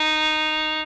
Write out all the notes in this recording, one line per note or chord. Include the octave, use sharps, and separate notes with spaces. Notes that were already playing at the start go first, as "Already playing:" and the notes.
Already playing: D#4